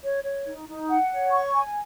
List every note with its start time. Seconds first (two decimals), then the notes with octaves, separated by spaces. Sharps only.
0.03 C#5
0.24 C#5
0.46 D#4
0.67 D#4
0.88 F#5
1.10 C#5
1.31 C#6
1.52 G#5